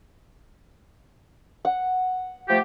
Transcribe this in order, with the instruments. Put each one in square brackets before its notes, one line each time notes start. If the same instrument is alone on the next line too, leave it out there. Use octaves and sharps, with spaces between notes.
[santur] F#5
[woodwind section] F3 A3 G4